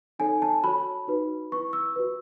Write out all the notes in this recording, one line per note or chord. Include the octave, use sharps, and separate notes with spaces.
D#4 A4 C#5 G#5
A5
F#4 C#5 B5
D#4 F#4 B4
E4 B4 C#6
E6
F#4 B4